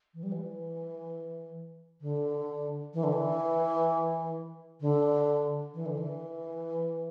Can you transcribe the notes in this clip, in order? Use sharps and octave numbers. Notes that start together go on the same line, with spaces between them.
E3
G3
E3
D3
E3
D3
E3
D3
E3
D3
E3